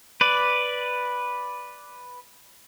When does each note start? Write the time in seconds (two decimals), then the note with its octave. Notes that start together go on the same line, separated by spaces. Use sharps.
0.21 B4 D5